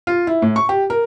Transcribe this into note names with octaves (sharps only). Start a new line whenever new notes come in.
F4
E4
A2
C#6
G4
A#4